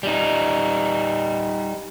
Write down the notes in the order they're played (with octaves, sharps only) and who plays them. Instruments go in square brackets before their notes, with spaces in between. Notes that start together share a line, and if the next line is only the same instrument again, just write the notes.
[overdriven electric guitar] G3 D#4